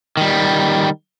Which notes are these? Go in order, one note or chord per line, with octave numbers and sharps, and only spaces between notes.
D#3 G3